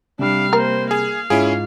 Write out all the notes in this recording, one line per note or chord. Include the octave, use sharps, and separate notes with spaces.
C3 G3 D4 F5
A#3 A#4 C5
G#4 F5
G#2 C#4 E4 F4 G#4 D7